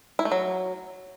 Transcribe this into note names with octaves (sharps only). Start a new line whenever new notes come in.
E4
A3
F#3